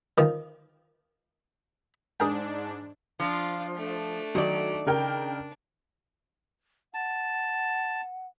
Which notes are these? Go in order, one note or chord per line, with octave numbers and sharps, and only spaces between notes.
D#3 F3
G#2 D4 G#4 A#4 G5
F3 D4 F4
A3 D4
D#3 F#3 D5
C#3 D4 A#4 G5
F#5 A5